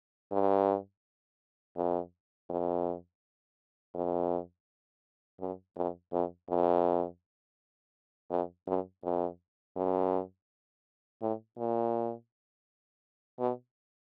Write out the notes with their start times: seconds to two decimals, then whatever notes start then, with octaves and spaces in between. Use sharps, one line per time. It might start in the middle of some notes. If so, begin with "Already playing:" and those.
0.32 G2
1.76 F2
2.50 F2
3.95 F2
5.40 F#2
5.76 F2
6.12 F2
6.49 F2
8.31 F2
8.67 F#2
9.04 F2
9.76 F#2
11.22 A2
11.58 A#2
13.39 B2